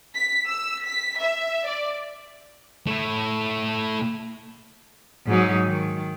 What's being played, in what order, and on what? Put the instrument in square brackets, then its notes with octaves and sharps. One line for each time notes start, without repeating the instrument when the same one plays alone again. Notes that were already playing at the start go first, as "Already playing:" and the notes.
[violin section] B6
E6
B6
E5
D5
[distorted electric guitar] A3 E4
[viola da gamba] G#2 F#3 D#4
D#3